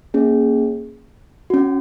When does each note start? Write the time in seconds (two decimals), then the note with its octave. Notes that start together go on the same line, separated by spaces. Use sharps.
0.14 A#3 C#4 G#4
1.50 C#4 F#4